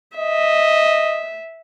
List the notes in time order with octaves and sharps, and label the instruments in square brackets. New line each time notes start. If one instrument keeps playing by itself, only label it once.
[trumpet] D#5 [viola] E5